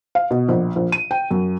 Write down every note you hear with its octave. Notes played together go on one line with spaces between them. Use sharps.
F5
B2
A#1
A#1
D#7
G5
F#2